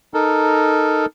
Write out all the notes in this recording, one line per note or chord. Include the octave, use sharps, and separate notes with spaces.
D#4 A4 A#4